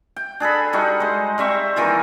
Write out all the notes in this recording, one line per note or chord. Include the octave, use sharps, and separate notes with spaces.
G5
D4 G#4 A4 B5
G3 D#4 F#4
G#3 C5
G3 C4 E5 C#6
D#3 E3 A#3 F4